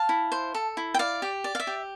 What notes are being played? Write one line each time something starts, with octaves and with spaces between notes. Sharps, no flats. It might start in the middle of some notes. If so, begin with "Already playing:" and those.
Already playing: F5 A5
E4
C5
A4
E4
G5
D5 F5
G4
D5
F5
E5
G4